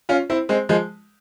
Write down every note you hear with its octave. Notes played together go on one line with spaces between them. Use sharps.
C#4 F4
C4 E4
G#3 C4
F3 G#3